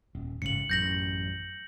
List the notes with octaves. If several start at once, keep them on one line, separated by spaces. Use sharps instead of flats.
D#1
A1 G#2 C#3 C#7 F#7
A1 F#2 G6 A#6 F#7